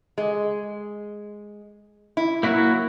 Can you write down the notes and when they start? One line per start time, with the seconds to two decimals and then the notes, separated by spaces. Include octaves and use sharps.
0.18 G#3
2.17 E4
2.43 F#3 A#3 E4 F#4